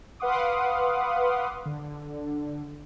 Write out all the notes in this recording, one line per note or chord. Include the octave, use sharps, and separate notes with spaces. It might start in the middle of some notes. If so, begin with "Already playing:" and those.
B4 F5 F#5 C6 D6 D#6
D3